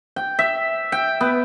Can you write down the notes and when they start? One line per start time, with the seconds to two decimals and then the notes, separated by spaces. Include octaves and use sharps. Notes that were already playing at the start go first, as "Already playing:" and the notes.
0.16 G5
0.39 E5
0.92 G5
1.21 B3